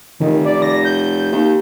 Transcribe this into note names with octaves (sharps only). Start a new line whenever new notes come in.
F1 D#3
D5
A#6
G6
D#2